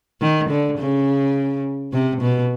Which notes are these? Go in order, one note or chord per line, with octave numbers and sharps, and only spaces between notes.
D#3
D3
C#3
C3
B2